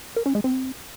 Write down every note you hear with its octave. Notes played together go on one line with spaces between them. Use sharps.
A#4
C#4
G#3
C4